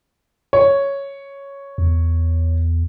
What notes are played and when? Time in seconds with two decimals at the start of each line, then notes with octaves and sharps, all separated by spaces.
0.53 C#5
1.78 E2